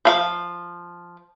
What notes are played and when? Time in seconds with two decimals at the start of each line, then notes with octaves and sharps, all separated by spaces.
0.05 F3 F5